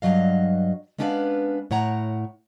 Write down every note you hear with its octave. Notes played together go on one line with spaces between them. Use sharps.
G2 E3 F#3 D#5 F5
G#3 B3 C#4 D4 B4 F5
A2 C#5 F#5 A#5